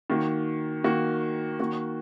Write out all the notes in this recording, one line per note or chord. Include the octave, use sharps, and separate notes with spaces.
D#3 A#3 F#4
D#3 A#3 F#4
D#3 A#3 F#4